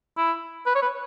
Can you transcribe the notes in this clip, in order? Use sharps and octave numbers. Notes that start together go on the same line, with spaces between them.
E4
B4
C#5
B4